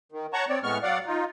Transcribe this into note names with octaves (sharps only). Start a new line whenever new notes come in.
D#3
C#5 F#5 A5 A#5 C#6
C4 C#5 D5
A2 G#3 B3 C#6 F6
F#3 D5 F5 F#5
D#4 F4